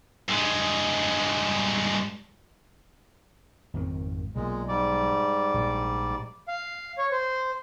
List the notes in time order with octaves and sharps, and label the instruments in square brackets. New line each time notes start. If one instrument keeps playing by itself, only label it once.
[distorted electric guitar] G2 G#3
[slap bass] G#1 F2 D#3
[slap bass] B1 [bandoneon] A#2 G#3
[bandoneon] G#2 G3 D5
[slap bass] A#1
[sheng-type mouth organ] F5
C#5
C5